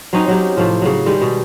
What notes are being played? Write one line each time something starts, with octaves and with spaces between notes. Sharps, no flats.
F#3 C4 C#4 D#4
F#3 G4
A2 C3 F3 F4
C#3 F#3
D#3 G3 G#3
B2